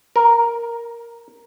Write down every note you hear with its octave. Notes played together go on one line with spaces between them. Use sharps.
A#4